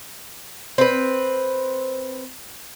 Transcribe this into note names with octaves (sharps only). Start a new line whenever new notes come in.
C4 B4